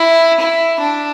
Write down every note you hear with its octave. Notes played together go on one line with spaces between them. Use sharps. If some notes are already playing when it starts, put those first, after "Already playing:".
Already playing: E4
E4
D4